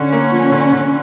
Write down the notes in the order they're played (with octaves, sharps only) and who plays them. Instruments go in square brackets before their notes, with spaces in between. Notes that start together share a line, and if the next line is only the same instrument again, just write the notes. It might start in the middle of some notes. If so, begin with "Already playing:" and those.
Already playing: [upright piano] D3 [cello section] C#4
[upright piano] A#3
F3
D3
D3